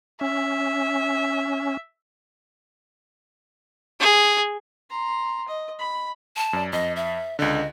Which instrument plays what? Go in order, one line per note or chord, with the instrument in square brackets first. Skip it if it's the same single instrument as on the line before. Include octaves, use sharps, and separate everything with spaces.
[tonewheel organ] C#4 [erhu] E5
[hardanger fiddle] G#4
[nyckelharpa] A#5 C6
D#5
B5
[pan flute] A5
[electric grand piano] F#2 D5
[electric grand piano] F2 [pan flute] D#5
[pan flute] E5
[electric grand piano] C#2 D3 [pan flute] D#5